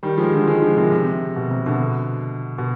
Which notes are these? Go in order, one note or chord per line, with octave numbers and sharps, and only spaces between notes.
D#3 G3
F3 G#3
D3 F3
F3 G#3
D3 F3
C3 D#3
C3
B2
C3
B2 D3
B2